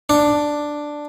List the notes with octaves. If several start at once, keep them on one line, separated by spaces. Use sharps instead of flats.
D4